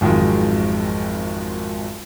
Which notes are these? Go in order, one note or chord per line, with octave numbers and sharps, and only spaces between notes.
G#1 F2 D#3 F#3 G#3